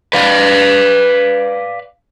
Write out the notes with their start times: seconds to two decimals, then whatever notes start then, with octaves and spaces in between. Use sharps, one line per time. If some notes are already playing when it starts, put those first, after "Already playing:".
0.13 B4 D5 F5